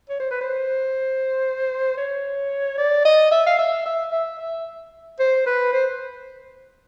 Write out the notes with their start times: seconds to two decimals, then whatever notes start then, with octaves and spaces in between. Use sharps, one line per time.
0.09 C#5
0.20 C5
0.31 B4
0.41 C5
1.97 C#5
2.78 D5
3.05 D#5
3.31 E5
3.46 F5
3.59 E5
3.86 E5
4.12 E5
4.39 E5
5.19 C5
5.46 B4
5.73 C5